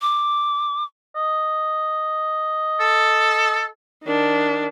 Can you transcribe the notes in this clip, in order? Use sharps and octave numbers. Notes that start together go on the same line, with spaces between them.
D6
D#5
A4
D#3 D4